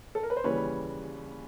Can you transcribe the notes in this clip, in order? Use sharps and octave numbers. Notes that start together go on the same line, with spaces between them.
A4
A#4
B4
C5
D#2 C#3 E3 G3 B4 C#5